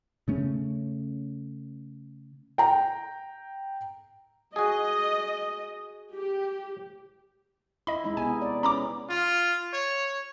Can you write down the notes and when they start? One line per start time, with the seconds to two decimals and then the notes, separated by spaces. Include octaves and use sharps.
0.28 C#3 A3 C#4
2.58 G5 A#5
4.56 F#4 G#4 D#5
6.14 G4
7.87 E4 D#5 B5
8.04 G#3 D#4 E4
8.17 C3 B3 D#4 G#5
8.42 D5
8.63 C#4 A#5 B5 D6
9.09 F4
9.73 C#5